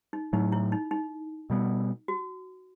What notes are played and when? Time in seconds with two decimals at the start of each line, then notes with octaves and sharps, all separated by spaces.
0.13 D#4
0.33 A2 F#3 A3 D#4
0.52 E4
0.72 D#4
0.91 D#4
1.50 B2 G3 B3
2.08 F#4